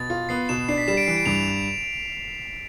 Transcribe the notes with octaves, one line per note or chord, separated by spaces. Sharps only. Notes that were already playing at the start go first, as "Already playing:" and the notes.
Already playing: B2 A6
F4
B3 C7
B2 E7
D4 C7
B6
G3 E7
D7
E3 C7
D7
G2 F7
F7